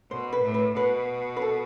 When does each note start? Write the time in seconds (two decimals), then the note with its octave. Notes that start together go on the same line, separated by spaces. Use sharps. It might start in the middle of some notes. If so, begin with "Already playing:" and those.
0.11 B2 C5
0.33 B4
0.43 A2
0.54 B4
0.76 B2 B4
1.37 B4
1.42 A4